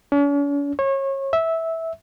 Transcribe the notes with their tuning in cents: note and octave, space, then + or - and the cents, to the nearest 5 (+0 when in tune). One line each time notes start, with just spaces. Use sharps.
C#4 +45
C#5 -30
E5 -10